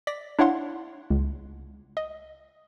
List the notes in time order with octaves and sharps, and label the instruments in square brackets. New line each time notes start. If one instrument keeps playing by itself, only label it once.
[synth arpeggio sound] D5 A#6 B6
D4 E4 C#5 F5 F#5 C6
C#2
D#5